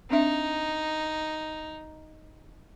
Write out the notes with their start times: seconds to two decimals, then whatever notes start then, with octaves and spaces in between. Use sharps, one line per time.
0.11 C4 D4 D#4 E5